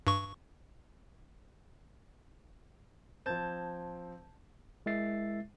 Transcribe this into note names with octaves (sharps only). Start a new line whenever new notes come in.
G2 C#6
F3 C4 A5 G6 G#6
G#3 E4 A#4 E5 A6 C7